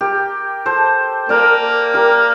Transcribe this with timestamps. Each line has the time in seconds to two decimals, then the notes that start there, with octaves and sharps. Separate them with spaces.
0.01 G4 A#4
0.66 A4 C5
1.29 A#3 A#4 D5
1.94 G4 A#4